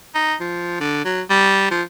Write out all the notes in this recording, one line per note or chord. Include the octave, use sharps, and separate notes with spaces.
D#4
F3
D3
F#3
G3
F3